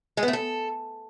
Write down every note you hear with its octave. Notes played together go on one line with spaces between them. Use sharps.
G#3
B3
A3
A4